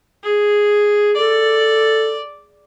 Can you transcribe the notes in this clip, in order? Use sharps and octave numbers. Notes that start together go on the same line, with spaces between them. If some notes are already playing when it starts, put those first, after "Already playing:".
G#4
A4 D5